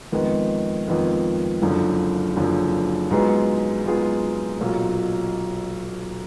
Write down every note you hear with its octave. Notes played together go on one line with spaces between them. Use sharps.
F2 D#3 G#3 B3
F2 D#3 G#3 B3
F#1 F#2 D3 F3
F#1 F#2 D3 F3
G#2 F#3 B3 F4 G#4
G#2 F#3 B3 F4 G#4
B1 A#2 F#3